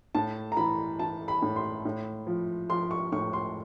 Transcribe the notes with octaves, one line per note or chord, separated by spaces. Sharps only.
A2 A5
A#5
E3 B5
E3 A5
B5
A2
C6
A2
F3
F3 C6
C#6
A2 C#6
C6